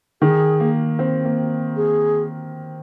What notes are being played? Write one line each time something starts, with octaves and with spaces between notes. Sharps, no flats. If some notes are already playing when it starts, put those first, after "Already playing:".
D#3 G#4
A#3
C4
A#3
G#4